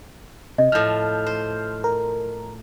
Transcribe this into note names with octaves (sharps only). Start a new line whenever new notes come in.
C3 D#5
A2 F3 F6 G6
C5
A#4